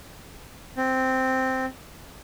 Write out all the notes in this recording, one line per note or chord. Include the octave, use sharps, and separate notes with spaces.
C4